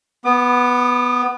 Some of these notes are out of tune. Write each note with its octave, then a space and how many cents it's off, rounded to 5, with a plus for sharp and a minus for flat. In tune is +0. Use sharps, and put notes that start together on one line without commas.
B3 +0 D6 +45